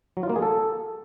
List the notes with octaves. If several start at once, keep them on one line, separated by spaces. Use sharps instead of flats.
F#3
F4
A#3
G#4
A4